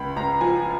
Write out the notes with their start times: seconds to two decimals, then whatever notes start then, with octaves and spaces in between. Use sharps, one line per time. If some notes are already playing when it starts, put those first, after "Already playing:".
Already playing: C#2 B5
0.16 C#2 A#5
0.41 F3 G#5